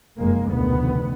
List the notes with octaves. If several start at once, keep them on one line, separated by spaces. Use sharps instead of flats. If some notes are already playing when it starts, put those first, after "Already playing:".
F1 F#2 G#3 A#3
F1 D2 B2 D3 D#3 B3